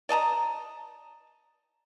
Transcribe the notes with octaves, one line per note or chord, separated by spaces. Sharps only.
D5 D#5 A5 A#5